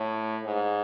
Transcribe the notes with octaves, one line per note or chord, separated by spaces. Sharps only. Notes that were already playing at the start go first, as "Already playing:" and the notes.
Already playing: A2
G#2